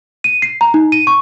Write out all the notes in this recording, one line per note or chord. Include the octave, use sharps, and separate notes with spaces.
D#7
C7
A#5
D#4
D#7
C#6